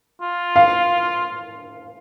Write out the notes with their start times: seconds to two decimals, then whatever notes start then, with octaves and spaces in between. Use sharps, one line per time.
0.21 F4
0.56 F5